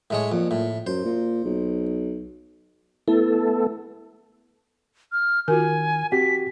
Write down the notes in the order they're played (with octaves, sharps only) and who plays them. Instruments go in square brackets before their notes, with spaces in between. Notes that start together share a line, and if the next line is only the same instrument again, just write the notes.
[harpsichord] A2 G#3 C#5
[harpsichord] F2 [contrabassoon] A#2
[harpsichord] A2
[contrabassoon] F#2 [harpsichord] C5
[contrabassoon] A#2
B1
[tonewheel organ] A3 B3 A4 [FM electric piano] E4
[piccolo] F6
[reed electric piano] D#3 [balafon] F4 F#4 A#4 [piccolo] G#5
[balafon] C4 [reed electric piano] F#4 G4 [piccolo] B6